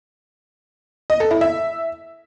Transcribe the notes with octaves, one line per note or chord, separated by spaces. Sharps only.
D#5
A4
E4
E5